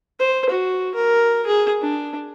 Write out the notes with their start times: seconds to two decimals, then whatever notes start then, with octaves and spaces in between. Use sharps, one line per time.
0.19 C5
0.50 F#4
0.95 A#4
1.46 G#4
1.82 D4